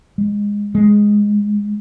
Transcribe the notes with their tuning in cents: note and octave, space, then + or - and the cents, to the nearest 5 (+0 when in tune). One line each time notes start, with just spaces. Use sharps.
G#3 -15
G#3 -5